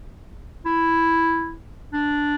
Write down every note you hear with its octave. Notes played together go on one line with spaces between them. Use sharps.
E4
D4